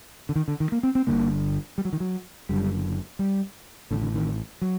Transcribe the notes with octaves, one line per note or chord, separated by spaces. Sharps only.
D3
D#3
D3
D#3
A#3
C4
C4
G1 G2 D3 A#3
G3
F#3
D#3
F#3
F#1 F#2 D3 G3
G3
A1 A2 D3
D3
D#3
F#3